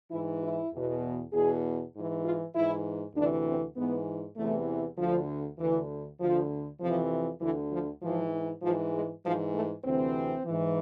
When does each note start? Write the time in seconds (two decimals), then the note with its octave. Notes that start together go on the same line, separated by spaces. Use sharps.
0.11 G#2 E3 E4
0.42 E4
0.72 E2 B2
1.32 E2 B2 G#4
1.93 G#2 E3
2.24 F4
2.54 G#2 E3 E4
3.15 D2 C3 E3 D4
3.45 C4
3.76 G#2 E3 B3
4.37 E2 C3 E3 A3
4.97 D2 D3 F3
5.58 D2 D3 E3
6.19 D2 D3 F3
6.80 F2 C3 E3 F3
7.41 D2 D3 E3
7.71 F3
8.02 G#2 E3 F3
8.62 G#2 E3 F3
8.94 G#3
9.24 G#2 E3 F3
9.54 A3
9.84 D2 C3 E3 C4
10.45 G#2 E3